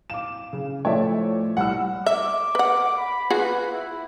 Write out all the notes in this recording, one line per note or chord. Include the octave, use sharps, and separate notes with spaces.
F5 D6 E7
C#3
A2 F3 A3 C#5 D5 E5
C2 F#5 E6 F6
E5 D6
B4 F#5
B5
F4 F#4 G#4 B4
E4